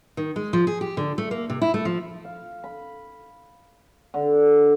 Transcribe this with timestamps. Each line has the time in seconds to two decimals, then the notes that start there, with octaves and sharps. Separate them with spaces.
0.17 D#3
0.36 G#3
0.53 F3
0.67 G#4
0.81 G4
0.97 D3
1.18 A3
1.31 A#3
1.50 C3
1.62 E4
1.74 A3
1.85 F3
2.25 F5
2.64 B5
4.14 D3